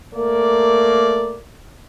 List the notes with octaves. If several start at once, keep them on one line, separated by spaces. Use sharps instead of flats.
A3 A#3 A#4 D5